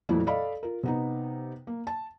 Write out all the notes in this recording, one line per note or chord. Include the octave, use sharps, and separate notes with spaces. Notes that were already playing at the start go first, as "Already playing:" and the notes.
F2 A#2 E3 F#3 A3 E4
A4 D5 D#5 F5 B5
F4 A#4
C3 B3 D#4
A#3
A5